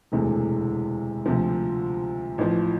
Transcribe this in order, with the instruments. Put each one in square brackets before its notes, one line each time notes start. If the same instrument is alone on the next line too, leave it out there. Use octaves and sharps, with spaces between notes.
[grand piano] E1 D2 C3 E3 A3
D2 C3 F3
A1 A2 F3